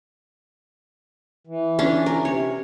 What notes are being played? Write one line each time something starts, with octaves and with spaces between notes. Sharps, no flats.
E3
C#4 D4
A#4
C3 C#5